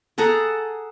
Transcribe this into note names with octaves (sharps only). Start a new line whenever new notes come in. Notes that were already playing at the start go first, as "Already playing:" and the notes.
G#4 A4 F#5 A#5